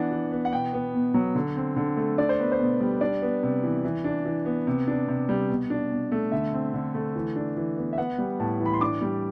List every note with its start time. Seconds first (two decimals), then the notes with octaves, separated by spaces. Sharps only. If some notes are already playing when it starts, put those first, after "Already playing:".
Already playing: E3 B3 D4 F#5
0.11 E3
0.32 B3
0.45 F#5
0.52 B2 G5
0.73 B3
0.94 B2
1.14 F#3
1.35 D3
1.56 C4
1.76 D3
1.97 A3
2.18 D4 D5
2.29 C5
2.39 B3 B4
2.52 C5
2.59 B2
2.81 G3
3.01 D4 D5
3.22 B3
3.43 C3
3.63 E3
3.84 E3
4.04 D4
4.25 E3
4.45 B3
4.67 C3
4.87 D4
5.08 C3
5.29 G3
5.50 B2
5.70 D4
5.91 B2
6.12 A3
6.32 D3 E5
6.53 C4
6.74 D3
6.94 A3
7.15 E3
7.36 D4
7.57 E3
7.77 B3
7.93 E5
7.98 B3 F#5
8.18 G3
8.40 A2 A5
8.60 E3
8.66 B5
8.73 C6
8.81 D4 D6
9.01 G3